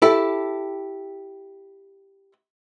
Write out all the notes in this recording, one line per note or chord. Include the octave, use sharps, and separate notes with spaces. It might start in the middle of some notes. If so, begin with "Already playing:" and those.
E4 G4 A4